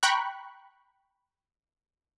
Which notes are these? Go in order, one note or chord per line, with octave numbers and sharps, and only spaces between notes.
G5 A#5 B5 C#6 F#6